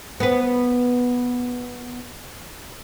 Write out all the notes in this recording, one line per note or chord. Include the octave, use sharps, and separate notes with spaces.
B3 B4